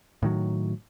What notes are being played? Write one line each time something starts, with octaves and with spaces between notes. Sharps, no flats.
A2 D#3 F#3